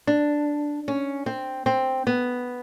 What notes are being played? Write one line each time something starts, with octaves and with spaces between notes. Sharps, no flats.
D4
C#4
C4
C4
B3